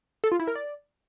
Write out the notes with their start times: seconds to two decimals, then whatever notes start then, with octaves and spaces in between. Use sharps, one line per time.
0.24 A4
0.32 F4
0.40 E4
0.47 A#4
0.55 D5